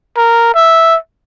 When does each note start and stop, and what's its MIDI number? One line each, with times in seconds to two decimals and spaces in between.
0.17 0.54 70
0.55 0.96 76